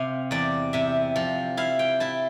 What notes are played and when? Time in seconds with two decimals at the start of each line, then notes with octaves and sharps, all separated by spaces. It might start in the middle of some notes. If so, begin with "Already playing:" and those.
Already playing: C3 F5
0.31 E2 D5
0.73 C3 E5
1.16 F3
1.57 E4 F5
1.79 G5
2.00 E4 A5